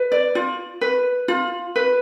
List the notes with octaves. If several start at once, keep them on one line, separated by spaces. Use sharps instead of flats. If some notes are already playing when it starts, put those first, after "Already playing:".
Already playing: B4
D5
F4
B4
F4
B4